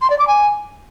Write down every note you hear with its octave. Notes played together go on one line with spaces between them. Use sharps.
C6
D5
D6
G#5